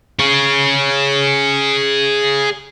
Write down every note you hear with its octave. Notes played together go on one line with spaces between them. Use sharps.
G#4 C#5